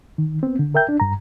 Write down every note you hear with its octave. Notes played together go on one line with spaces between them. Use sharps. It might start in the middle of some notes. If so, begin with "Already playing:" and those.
D#3
B3 C4
D3
A#4 E5 G5 G6
D4
G2 A#5